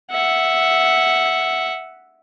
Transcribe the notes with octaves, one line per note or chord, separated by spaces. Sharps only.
E5 F#5